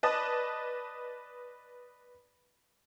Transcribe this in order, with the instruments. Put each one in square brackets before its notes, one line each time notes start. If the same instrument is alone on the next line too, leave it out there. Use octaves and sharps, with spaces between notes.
[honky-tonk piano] B4 D5 D#5 A5 D#6 A6